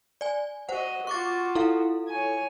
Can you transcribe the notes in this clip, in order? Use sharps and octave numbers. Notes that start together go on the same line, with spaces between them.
D5 G#5
F#4 C5 D#5 F#5
F4 F#4 C#6 D6 A6
E4 A4 F5
C#5 G#5